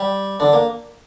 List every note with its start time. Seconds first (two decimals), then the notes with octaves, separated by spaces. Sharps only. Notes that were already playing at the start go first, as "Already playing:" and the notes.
Already playing: G3 G4
0.40 D3 D4
0.53 A#3